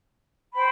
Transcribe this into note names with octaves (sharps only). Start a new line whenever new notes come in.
C5 G5 B5